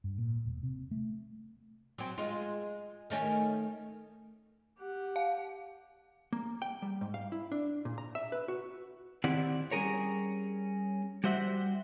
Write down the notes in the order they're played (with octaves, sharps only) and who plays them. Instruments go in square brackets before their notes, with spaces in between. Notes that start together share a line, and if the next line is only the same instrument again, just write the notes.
[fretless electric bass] G2
A#2
E1
C3
A3
[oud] F#3 C4
G#3 F4
D#3 A3 C#4
[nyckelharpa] G4 F#5
[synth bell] F5
[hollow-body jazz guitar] A#3
G5
G3
G#2
F5
E4
D4
A#2
A#5
E5
B4
F#4
[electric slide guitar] D#3 C4 E4 G4 D5 F#5
G3 C#4 D#4 G#4 A#4 C#5
G3 F#4 C5 E5 F#5